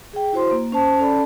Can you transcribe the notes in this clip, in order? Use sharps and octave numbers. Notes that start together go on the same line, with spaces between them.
G#4 G5
E4 F#4 C5 C6
A#3
C#4 C5 A5
C#4 A4 D5 A5 B5